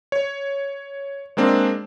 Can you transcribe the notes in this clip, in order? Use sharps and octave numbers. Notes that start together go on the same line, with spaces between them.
C#5
G#3 A#3 C4 D4